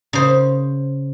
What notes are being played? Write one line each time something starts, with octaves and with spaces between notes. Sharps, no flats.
C#3 C5